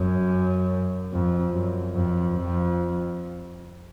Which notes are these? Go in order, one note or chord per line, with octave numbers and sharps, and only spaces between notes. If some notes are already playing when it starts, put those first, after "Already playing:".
Already playing: F#2
F2
F#2
F2
F2